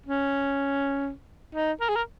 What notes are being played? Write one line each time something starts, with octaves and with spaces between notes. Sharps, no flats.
C#4
D#4
A#4
G#4
A#4